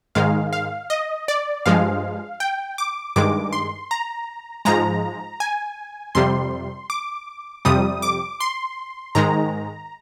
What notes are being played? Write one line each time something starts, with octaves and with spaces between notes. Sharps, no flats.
G#2 D#3 G#3 F5
F5
D#5
D5
G2 F3 G#3 F5
G5
D6
G2 D#3 G#3 D6
C6
A#5
G#2 F3 G#3 A#5
G#5
F2 C3 G3 C6
D6
F2 C3 G3 D#6
D6
C6
G#2 D#3 G#3 A#5